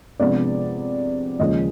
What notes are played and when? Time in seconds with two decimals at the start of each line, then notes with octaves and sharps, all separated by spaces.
0.20 C3 F3 G#3 B3 D4 D5
1.39 D#2 C#3 F3 G#3 D#5